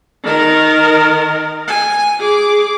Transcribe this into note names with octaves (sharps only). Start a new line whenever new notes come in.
D#3 A#4
G#5
G#4 D6